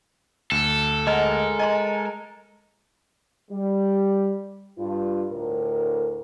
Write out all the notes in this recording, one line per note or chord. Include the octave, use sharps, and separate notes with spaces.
D2 A4
G#3 A#4 D#5 F#5
D#5 G#5 A#5 C6
G3
G2 F4
D2 A2 A#4